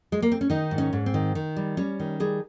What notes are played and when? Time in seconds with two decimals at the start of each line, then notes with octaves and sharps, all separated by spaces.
0.12 G#3
0.22 A#3
0.32 C4
0.41 C#4
0.50 D#3 D#4
0.71 G#2
0.78 C#4
0.93 G#2
1.06 C4
1.14 D#3
1.35 D#3
1.56 G3
1.77 G3 C#4
2.00 D#3
2.20 G3 G#4